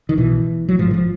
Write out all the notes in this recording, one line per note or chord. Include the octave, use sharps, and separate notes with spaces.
D#3
B1 B2 E3
F#3
A1 G#2 F3
E3
F3